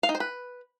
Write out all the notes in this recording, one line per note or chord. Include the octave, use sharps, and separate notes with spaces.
F5
D#4
C5
B4